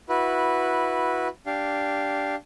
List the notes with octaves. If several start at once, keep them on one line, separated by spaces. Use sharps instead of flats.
E4 F#4 B4
D4 G4 F5